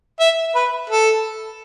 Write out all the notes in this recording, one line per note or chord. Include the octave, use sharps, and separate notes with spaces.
E5
B4
A4